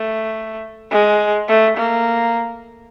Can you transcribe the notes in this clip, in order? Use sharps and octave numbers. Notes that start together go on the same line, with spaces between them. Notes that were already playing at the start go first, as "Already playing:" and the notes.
Already playing: A3
G#3
A3
A#3